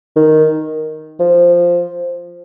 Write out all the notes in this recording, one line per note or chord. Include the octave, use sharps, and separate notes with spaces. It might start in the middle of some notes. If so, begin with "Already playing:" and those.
D#3
F3